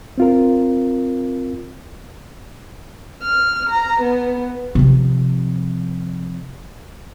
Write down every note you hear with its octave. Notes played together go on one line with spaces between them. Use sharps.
C4 F4 A#4
F6
A#5
B3
C3 F3